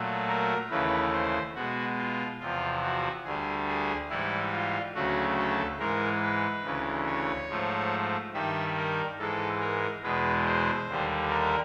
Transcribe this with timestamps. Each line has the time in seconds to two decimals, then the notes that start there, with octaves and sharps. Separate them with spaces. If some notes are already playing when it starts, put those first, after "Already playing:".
Already playing: A#2 F#3 A3
0.28 A#4
0.70 D#2 C#3 E3 A3 B4
1.13 C5
1.55 B2 G#3 F#4
1.98 F4
2.40 E2 C3 F3 F4
2.82 F#4
3.25 D2 D3 G3 G#4
3.68 G#4
4.10 G#2 E3 G3 E4
4.52 F4
4.95 D2 C#3 F#3 A3 F#4
5.37 A4
5.79 G#2 E3 G#3 A#4
6.22 B4
6.64 D2 C#3 E3
7.06 C#5
7.49 G#2 F3 A3
8.33 G2 D#3 G3 E5
8.76 A#4
9.19 G#2 E3 G#3 A4
9.61 A#4
10.03 E2 B2 G#3 B4
10.45 C5
10.88 D#2 D3 G3
11.30 A#4